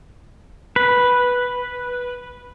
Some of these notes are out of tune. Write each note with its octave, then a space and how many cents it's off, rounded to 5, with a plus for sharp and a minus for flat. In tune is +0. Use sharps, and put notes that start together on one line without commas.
B4 -5